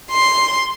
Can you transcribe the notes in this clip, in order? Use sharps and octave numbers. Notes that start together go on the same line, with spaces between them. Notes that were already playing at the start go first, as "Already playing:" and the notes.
C6